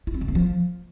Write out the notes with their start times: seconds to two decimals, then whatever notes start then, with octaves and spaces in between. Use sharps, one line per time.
0.07 E4
0.14 C4
0.21 C#3
0.28 A#3
0.35 F3